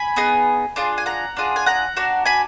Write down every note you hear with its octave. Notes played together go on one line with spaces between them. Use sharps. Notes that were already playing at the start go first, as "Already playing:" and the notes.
Already playing: G#5 B5
B3 D#4 G#4
D4 F4 G#4
G#5
F#5 A#5
D4 F4 G#4
G#5
F#5 A#5
D4 F#4
G#5 B5